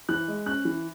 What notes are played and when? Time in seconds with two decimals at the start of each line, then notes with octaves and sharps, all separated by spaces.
0.09 E3 F#6
0.28 G#3
0.46 C#4 F#6
0.65 E3